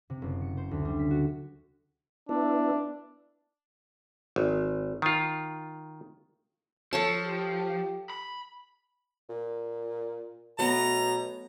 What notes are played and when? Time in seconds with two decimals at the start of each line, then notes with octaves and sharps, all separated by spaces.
0.10 C3
0.22 F#1
0.42 C#7
0.57 C5
0.71 D2
0.85 G3
0.99 B6
1.10 F#4
2.29 B3 D4 E4
4.36 G#1
5.02 D#3 F4
6.93 F3 A4 C#5 A5
7.27 G4
8.10 B5
9.29 A#2
10.59 B2 F#3 A3 B3 A#5